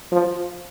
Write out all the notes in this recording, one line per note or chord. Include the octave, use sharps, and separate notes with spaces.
F3